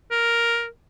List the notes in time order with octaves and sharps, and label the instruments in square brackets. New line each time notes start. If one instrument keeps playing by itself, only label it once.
[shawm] A#4